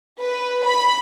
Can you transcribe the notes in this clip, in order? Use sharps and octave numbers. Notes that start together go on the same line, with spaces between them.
B4
B5